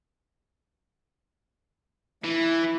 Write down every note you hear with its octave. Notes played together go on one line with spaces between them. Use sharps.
E3 E4